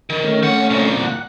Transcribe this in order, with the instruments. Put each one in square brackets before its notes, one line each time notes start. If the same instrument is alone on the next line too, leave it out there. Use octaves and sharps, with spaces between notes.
[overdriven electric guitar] D#3
[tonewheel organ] A3 C#4
[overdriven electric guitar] C4 F#5
C2 A#2
[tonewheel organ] F#5